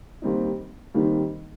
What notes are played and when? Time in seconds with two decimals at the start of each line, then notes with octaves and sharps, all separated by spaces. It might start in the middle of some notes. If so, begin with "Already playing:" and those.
0.22 D#2 D#3 G3 C4 D#4
0.94 D#2 D#3 G3 C4 D#4